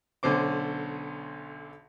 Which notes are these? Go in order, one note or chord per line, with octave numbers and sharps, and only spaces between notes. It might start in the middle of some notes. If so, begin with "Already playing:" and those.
B1 D3 C#4 C5 D6